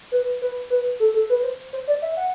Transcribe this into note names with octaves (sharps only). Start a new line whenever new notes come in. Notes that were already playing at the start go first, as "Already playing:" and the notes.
B4
B4
B4
A4
A4
B4
C5
C5
D5
E5
F#5